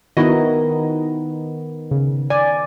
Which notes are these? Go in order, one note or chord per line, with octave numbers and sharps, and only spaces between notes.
D#3 B3 D#4 E4 F#4 D#5
C#3
D5 G#5